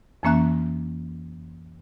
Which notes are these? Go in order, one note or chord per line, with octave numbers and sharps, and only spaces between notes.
F2 E3 A#3 C#4 E5 F#6